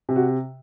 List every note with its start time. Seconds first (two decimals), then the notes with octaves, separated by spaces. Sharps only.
0.09 C3
0.16 F#4